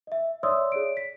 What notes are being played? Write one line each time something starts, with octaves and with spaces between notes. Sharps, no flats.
D#5 E5
C#5 D5 E5 C6 D#6 E6
G#4 C#5 D5 D7
B6